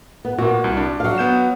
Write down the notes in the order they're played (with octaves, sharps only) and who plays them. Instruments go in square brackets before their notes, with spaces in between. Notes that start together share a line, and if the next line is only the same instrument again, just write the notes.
[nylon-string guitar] B3
[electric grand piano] A#2 A#3 [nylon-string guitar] F#4
[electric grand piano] C2
D4
[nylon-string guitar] F#3 F5
[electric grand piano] B3 G6 E7